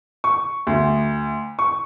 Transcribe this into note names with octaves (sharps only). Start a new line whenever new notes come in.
C#6
D2
C#6